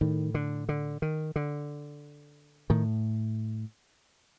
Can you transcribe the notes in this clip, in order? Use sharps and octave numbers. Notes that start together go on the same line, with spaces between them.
A2 D#3
D3
D3
D#3
D3
A2 D#3